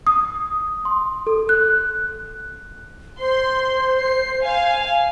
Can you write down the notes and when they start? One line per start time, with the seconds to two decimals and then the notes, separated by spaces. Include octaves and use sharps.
0.07 D#6
0.85 C6
1.27 A4
1.49 F#6
3.20 C5 C6
3.97 C7
4.43 F5 G#5